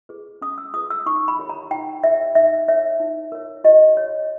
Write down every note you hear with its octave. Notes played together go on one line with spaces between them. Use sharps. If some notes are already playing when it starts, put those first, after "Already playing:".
G#4 B4
C#4 D#6
E6
G#4 B4 D#6
E6
D#4 C#6
B5
G4 A#4 C#5
A#5
D#4 G5
G4 A#4 C#5 E5
D#4 E5
A#4 C#5 E5
D#4
A#4 C#5
G4 D#5
C#5